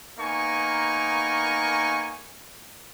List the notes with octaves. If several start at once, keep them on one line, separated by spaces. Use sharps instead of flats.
A#3 B3 D#4 A#4 G#5 C#6